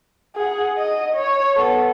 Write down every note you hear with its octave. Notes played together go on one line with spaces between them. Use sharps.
G#4 F#5
D#5
C#5
B3 A4